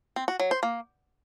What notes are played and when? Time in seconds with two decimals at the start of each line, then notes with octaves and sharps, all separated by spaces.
0.16 C4
0.28 F#4
0.40 F#3
0.51 C5
0.63 A#3